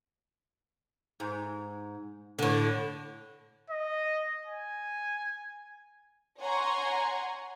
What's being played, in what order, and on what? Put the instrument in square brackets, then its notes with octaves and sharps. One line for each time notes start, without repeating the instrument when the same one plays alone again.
[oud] G#2
A2 D3
[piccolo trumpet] D#5
G#5
[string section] C#5 F#5 G#5 A#5 C6 C#6